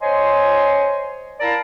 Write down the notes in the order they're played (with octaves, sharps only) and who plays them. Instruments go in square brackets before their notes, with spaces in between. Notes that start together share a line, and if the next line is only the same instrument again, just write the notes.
[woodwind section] C5 C#5 D#5 G#5 C6
E4 A#4 D5 F5 A5 A#5